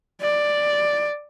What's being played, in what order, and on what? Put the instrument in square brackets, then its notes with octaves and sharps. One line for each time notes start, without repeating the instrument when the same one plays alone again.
[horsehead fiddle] D5